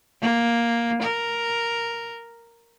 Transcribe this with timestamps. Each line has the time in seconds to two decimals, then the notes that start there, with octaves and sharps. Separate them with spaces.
0.22 A#3
1.02 A#4